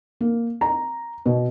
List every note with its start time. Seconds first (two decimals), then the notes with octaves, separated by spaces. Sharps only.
0.21 A#3
0.61 A#5
1.26 B2